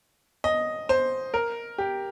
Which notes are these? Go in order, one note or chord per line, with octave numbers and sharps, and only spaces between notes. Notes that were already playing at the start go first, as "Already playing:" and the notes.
D#5
C5
A#4
G4